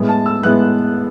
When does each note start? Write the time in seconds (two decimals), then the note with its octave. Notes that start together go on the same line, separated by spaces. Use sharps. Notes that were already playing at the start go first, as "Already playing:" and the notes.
Already playing: A2 G#3 B3 E4
0.09 A5
0.26 E6
0.43 A2 G#3 B3 E4 F#6